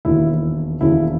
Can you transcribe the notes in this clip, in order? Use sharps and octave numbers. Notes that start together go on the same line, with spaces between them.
E1 D#2 D#3 E4
E1 D#2 C#3 E4